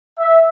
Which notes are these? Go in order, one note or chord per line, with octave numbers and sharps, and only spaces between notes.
E5